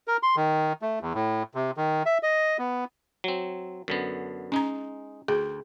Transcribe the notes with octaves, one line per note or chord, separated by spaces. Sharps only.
A#4
C6
D#3
A3
E2
A2
C3
D#3
E5
D#5
B3
F#3 C4
F#2 D3 B3
G#3 C#4 D#4 A#5
D2 G#4 G5